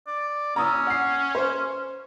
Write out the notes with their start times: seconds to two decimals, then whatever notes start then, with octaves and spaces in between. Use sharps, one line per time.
0.07 D5
0.56 C#4 A#5 D#6 E6
0.87 F#5 C7
1.35 C5